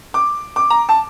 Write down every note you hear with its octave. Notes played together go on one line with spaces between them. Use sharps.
D6
D6
A#5
A5